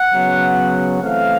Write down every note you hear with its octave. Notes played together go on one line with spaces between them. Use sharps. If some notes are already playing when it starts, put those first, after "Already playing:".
Already playing: F#5
C#3 F#3 B3
E3 A3 C4 F5